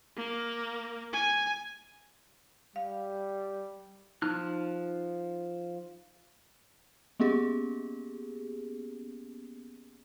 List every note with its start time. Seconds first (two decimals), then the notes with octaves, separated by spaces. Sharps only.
0.17 A#3
1.13 G#5
2.76 G3 F5
4.22 F3 D#4 F6 F#6
7.20 A#3 B3 C#4 G4 G#4